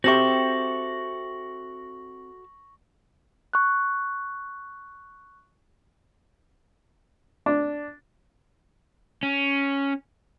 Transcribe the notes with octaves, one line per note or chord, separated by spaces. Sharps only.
C4 F#4 G4 A4 E5 C#6 A#6 F#7
C#6 F#6
D4
C#4